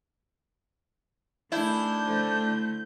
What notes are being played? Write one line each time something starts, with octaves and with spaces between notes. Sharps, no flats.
D#3 A3 D4 E4 G#4 G6
D3 A3 C5